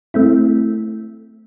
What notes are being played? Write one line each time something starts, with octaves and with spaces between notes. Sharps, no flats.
A3 C4 E4